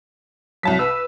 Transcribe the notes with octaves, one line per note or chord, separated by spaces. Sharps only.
C2 F#3 A5 B6
B4 E6